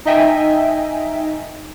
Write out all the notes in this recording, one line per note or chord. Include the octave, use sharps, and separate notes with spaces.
D#4 D#5 E5 G5 G#5